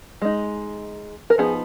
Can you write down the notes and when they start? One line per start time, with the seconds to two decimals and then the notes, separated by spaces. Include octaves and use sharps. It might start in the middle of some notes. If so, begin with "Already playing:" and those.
0.22 G#3 D#4
1.30 A#4
1.38 F3 B3 D#4 G#4